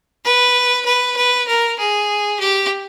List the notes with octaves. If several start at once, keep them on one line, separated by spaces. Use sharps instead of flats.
B4
B4
B4
A#4
G#4
G4